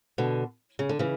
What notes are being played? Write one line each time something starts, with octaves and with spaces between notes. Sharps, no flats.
B2 D3
C#3
D3
C#3 E3